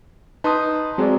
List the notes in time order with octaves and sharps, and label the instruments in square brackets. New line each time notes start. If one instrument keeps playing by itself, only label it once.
[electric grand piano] D#4 B4 [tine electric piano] A5 C6 D#6
[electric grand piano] F#3 G#3 [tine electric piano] C4 G#4 D5